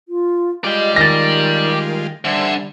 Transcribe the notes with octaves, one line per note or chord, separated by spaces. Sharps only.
F4
G3 G#3 F4 D5 D#5 G5
D#3 A6 A#6
D3 G3 C5 E5 G#5